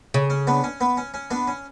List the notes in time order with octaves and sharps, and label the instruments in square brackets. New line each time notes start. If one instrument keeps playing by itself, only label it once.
[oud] C#3
[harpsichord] C#4
B3 D4
C#4
B3
C#4
C#4
B3 D4
C#4